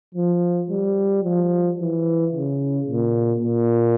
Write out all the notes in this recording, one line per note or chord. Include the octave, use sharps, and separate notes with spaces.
F3
G3
F3
E3
C#3
A#2
A#2